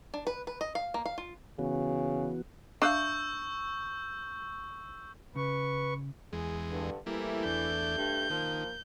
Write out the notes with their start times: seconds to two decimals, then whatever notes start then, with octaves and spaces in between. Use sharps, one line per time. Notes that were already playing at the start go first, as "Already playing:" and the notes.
0.14 D4
0.27 B4
0.47 B4
0.61 D#5
0.75 F5
0.94 A#3
1.06 F5
1.18 F4
1.59 C#3 E3 B3 F#4
2.82 D4 E5 F5 C#6 E6 G6
5.36 C#3 B4 C#6
6.33 E2 G#3 G#4
6.71 G2 D3
7.06 E3 G3 A3 A#3 E4
7.45 E2 D4 G6
7.96 G2
8.30 D#3 F3 A#3